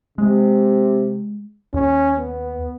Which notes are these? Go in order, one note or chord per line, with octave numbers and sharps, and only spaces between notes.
C3 G#3
D#2 C#4
B3